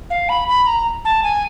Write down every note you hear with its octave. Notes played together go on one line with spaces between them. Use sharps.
F5
B5
B5
A#5
A5
G#5